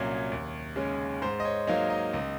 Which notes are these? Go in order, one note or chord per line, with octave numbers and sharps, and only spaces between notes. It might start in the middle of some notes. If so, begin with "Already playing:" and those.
Already playing: C2 A#2 F#3 C#4 C#5
D#2
C#3 G#3 C#4
G#2 C5
D#5
C#5
F#3 A#3 D#4 F5
D#5
C#2